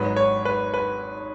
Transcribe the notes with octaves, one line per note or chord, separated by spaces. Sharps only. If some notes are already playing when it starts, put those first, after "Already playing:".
Already playing: G#1 G#2 F#3 B4
C#5
B4
B4